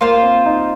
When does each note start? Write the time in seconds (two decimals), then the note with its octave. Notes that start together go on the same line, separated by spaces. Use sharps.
0.01 A#3 F4 C5 F5
0.23 C4
0.46 D#4